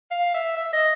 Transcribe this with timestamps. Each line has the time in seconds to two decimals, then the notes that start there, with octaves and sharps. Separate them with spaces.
0.11 F5
0.34 E5
0.57 E5
0.73 D#5